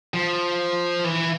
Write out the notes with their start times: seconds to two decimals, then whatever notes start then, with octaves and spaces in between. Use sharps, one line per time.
0.14 F3
1.04 E3